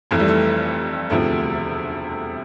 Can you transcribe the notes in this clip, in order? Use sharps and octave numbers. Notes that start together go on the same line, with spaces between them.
F1 F2 E3 A3
G3
A3
E1 D2 C3 F3 A3